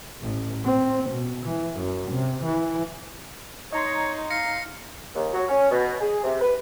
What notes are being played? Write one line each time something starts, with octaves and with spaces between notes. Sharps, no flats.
A1
C4
B2
E3
F#2
C3
E3
D#4 C#5 D#5 A#5 C6
F5 A#6 C#7
D#2
F#3
C#4
B2
G#4
C3
B4